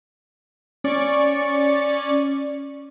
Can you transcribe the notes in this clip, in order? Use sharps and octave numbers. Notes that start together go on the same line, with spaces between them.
C#4 D5 C#6